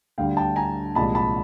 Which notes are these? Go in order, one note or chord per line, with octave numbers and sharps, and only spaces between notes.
D2 D3 G3 F5 G5
G5 A5
G#5 A#5
C2 A#2 F3 G#3 A5 B5
A5 B5